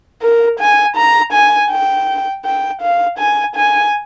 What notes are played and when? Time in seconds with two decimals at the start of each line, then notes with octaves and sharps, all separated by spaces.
0.22 A#4
0.60 G#5
0.96 A#5
1.33 G#5
1.71 G5
2.45 G5
2.81 F5
3.19 G#5
3.56 G#5